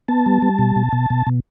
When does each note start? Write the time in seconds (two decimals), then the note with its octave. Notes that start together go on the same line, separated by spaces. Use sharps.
0.08 B3 A5
0.26 G3
0.42 G3
0.59 B2
0.76 B2
0.93 B2
1.10 B2
1.27 B2